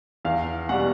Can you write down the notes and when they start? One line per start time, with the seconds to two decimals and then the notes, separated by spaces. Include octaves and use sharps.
0.25 E2 F5
0.69 B2 G3 F#5